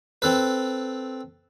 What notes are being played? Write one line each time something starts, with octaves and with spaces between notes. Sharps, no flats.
C4 A4 B4